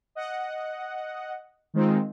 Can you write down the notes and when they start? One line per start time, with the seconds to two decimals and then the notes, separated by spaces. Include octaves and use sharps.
0.15 D#5 F#5
1.74 D#3 G#3 C4 D#4 F4